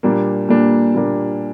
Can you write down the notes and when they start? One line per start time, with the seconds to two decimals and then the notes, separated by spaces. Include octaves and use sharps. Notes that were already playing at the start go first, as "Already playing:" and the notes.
0.03 A#2 G3 A#3 D4
0.49 A#2 G3 A#3 D4
0.94 A#2 G3 A#3 D4